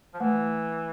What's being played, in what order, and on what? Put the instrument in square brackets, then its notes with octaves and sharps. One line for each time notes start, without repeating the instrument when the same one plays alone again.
[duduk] F3
[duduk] E3 [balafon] A3